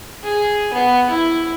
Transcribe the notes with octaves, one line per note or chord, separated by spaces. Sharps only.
G#4
B3
E4